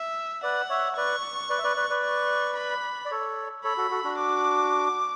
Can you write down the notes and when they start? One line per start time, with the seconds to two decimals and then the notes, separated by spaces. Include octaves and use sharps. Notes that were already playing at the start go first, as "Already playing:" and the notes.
Already playing: E5
0.43 B4 D5 F#5
0.69 C#5 E5
0.97 B4 D5 C#6
1.50 B4 D5
1.58 E5
1.64 B4 D5
1.77 B4 D5
1.90 B4 D5
2.04 C#6
2.57 B5
3.05 D5
3.11 A4 C#5
3.64 A4 C#5 B5
3.77 F#4 A4
3.91 F#4 A4
4.04 D4 F#4
4.18 D6